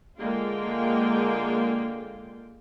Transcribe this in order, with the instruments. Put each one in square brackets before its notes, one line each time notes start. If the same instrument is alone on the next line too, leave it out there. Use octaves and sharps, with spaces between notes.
[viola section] D3 G#3 A#3 F4 G5